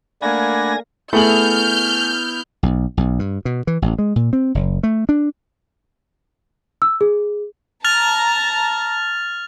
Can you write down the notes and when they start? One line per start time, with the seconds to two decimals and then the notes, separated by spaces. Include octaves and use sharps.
0.22 A3 A#3 D4 D5 F#5 G#5 B5 A#6
1.13 A3 B3 E4 G#4 F6 G6 F#7
2.63 B1
2.97 B1
3.19 G2
3.45 B2
3.67 E3
3.82 A1
3.99 G#3
4.16 A#2
4.33 C4
4.55 F#1
4.83 A3
5.09 D4
6.82 E6
7.01 G#4
7.84 A5 A#5 F6 A6 F7